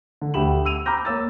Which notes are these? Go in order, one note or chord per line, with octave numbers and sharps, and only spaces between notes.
D3
D2 G4 B5 E7 F#7
E6 D#7 F7
A#5 B5 D6 F6 G6 A#6
A#3 C#5 E6 A6